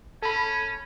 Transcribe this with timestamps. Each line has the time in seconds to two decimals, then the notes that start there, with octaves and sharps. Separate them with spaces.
0.22 C#4 A4 B5